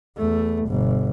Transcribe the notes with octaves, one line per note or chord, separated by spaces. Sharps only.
E2 A3
G1 B2